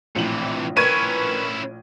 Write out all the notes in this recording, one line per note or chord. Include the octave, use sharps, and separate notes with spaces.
A#1 A2 C3 E3 F#7
C#4 E4 A#4 B4 C#6 G#6 D#7